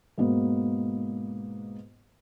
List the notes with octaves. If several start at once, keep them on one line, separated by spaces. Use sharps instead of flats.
G#2 B2 A#3 B3